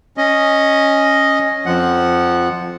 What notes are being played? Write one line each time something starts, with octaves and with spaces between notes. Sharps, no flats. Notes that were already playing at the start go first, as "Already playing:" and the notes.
C#4 D#5
F2 F3 F#5